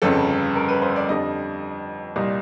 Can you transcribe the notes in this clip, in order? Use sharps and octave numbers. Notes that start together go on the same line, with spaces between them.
G1 F2 C#3 A4
A#4
B4
C5
D5
F2 D3 G3 D#5
C2 A#2 G3 D#5